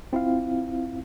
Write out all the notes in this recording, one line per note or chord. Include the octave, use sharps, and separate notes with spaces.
C4 E4 F4 F5